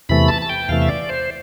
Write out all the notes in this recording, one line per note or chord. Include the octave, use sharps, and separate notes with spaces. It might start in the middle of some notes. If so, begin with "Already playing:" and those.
E2 C3 E3 A3 B5
A5
A5
G5
E2 C3 E3 A3 F5
E5
D5
C5